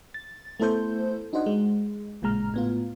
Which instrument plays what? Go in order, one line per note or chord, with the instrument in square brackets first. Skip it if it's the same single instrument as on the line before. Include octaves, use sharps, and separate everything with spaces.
[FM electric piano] A6
A3 B3 E4 A4 C5 G6
D4 D#4 F#4 C5 D#5 F#5
G#3
A1 A#2 C#3 G#3 A#5 F6
A2 B3 F4